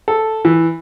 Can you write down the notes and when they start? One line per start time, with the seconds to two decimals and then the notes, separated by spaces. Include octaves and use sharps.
0.08 A4
0.45 E3